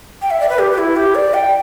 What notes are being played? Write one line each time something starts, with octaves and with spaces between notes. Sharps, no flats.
G5
E5
D5
B4
G4
G4
E4
G4
D5
G5